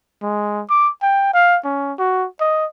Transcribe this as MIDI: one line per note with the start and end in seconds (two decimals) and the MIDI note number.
0.22 0.62 56
0.70 0.89 86
1.02 1.32 79
1.34 1.58 77
1.64 1.93 61
1.98 2.27 66
2.40 2.66 75